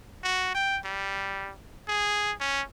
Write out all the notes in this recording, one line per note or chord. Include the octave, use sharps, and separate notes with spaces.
F#4
G5
G3
G#4
C#4